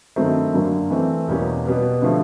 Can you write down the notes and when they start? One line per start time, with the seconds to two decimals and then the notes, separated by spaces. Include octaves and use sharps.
0.16 G2 D#3 F#3 A3 C4
0.54 F#2 D3 F#3 A#3 D4
0.90 E3 A3 C4
1.27 E2 B2 G3 A#3 C#4
1.65 B2 G3 B3
2.02 D3 F3 A3